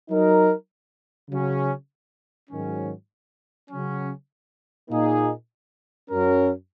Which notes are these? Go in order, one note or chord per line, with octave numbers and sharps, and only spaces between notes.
F#3 D#4 A#4
C#3 F#3 C#4
G#2 D#3 F#3 C#4
C#3 F#3 C#4
A#2 A#3 D#4 G#4
F#2 F#3 C#4 A#4